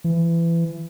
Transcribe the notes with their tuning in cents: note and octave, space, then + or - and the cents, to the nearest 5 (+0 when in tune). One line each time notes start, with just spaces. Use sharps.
E3 +25